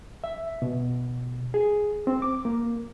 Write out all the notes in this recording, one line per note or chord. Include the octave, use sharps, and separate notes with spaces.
E5
B2
G#4
C4
D6
A#3